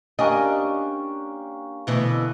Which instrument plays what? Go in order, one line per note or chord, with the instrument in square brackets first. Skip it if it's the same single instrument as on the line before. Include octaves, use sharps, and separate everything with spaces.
[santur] A#3 C#4 G4 [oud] D4 D#5
[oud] D2 B2 E3